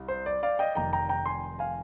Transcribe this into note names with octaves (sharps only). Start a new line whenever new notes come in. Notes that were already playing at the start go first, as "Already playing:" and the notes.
Already playing: C2
C5
D5
D5 F5
D#5 G5
F1 F2 D#3 G5 A#5
G5 A#5
G5 A#5
G#5 C6
F5 G#5